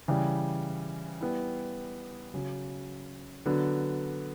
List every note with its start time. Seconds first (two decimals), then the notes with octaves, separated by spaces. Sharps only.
0.08 C#3 E3 G3
1.21 G3 B3 E4
2.34 C#3 F#3 C#4
3.46 D3 F#3 B3